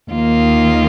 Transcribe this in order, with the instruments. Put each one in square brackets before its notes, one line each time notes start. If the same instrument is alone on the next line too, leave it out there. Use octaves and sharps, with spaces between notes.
[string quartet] D#2 D#3 A#3 F4